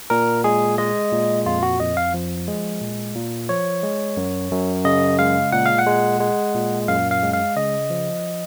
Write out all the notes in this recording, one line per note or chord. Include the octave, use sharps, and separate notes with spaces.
A#2 A#4
G#3 G#4
G#3 D#5
A#2
F2 F4
F#4
F2 D#5
F5
F3
G#3
A#2
A#2
F3 C#5
G#3
F#2
F#2
C#3 D#5
G#3 F5
A#2 F#5
F5
F#5
G#3
G#3
A#2
F#2 F5
F5
G#3
F5
C#3 D#5
F3